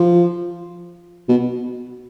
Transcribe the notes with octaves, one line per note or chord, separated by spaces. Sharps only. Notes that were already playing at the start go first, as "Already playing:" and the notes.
Already playing: F3
B2